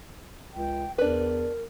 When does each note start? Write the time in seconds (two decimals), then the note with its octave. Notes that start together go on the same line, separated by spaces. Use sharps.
0.53 C#2 G5
0.98 E2 D4 A#4 B4